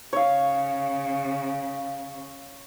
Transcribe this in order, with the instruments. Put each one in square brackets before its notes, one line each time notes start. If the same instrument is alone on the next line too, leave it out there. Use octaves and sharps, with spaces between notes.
[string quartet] C#3 [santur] C#5 F5